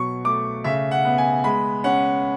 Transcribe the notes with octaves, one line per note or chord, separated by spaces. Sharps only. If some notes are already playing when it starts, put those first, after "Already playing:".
Already playing: B2 F#3 C#6
A3 D6
C#3 E5
F#5
B3
G#5
G#3 B5
C#4 F#5